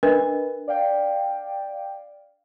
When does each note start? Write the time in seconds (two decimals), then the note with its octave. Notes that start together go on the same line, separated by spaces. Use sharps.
0.03 D4 A#4 B4 D#5
0.68 D5 F5 G5